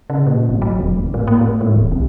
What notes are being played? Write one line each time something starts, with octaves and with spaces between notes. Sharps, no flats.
C#3
A#2
G#1
F#3
E1
F#1
A2
A#3
A2
G#2
D1
B1